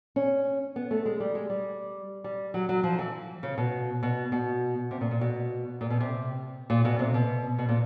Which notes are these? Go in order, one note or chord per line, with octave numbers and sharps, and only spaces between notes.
C#4
B3
A3
G#3
G3
G#3
G3
G3
F#3
F#3
F3
E3
C#3
B2
B2
B2
C3
A#2
A#2
B2
A#2
B2
C3
A#2
B2
C3
B2
B2
A#2